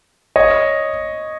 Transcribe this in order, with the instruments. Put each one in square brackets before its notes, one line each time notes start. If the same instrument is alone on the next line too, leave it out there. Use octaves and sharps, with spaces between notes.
[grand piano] C#5 D#5